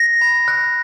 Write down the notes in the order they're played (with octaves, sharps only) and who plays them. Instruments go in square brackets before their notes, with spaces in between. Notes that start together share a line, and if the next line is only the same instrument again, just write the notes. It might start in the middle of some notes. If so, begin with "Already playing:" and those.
Already playing: [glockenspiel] A#6
B5
F#6